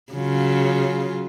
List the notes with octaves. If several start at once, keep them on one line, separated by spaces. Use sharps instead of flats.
C#3 F#3 F4